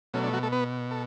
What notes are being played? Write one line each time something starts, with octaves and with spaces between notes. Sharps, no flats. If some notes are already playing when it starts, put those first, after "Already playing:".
B2 F#3 A3 C#4
D4
F#3 F#4
A3 A4
B3 B4
A4